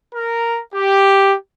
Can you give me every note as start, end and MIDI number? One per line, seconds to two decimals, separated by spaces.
0.14 0.58 70
0.74 1.34 67